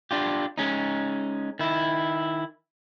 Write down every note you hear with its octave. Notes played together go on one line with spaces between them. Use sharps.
D4 F4 G4
G#3 C#4 D#4
D#3 E4